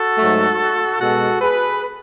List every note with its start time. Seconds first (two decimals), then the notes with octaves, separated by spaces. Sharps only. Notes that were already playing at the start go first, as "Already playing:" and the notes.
Already playing: F#4 A4
0.17 G#2 F#3 A3
1.00 B2 G#3 F#4 A4
1.41 G#4 B4